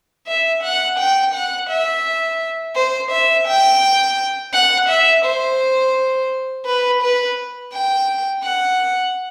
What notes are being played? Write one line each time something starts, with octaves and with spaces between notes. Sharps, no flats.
E5
F#5
G5
F#5
E5
C5
E5
G5
F#5
E5
C5
B4
B4
G5
F#5